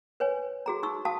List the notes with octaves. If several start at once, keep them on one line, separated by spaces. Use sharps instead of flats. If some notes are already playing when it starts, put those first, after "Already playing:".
B4 C#5 G#5
F#4 G#4 A#5
D#4 C#6 E6
F#4 F5 A5 D#6